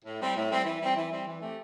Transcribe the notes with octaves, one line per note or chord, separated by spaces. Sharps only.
A2
G3 C4
A2
G3 C4
E3
G3 C4
E3
G3 C4
E3
A3 C4 G4